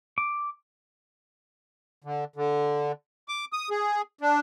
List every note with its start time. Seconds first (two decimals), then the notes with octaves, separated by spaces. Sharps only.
0.18 D6
2.04 D3
2.36 D3
3.28 D6
3.53 D#6
3.71 G#4
4.21 D4